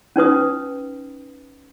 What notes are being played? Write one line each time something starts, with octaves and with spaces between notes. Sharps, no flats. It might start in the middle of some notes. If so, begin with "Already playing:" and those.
C#4 D#4 B4 D#6